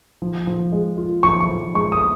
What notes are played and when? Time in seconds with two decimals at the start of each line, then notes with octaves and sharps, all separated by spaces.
0.22 F3
0.47 F3
0.72 G#3
0.98 F4
1.23 F3 C#6
1.40 C#6
1.49 F3
1.74 G#3 C#6
1.92 D#6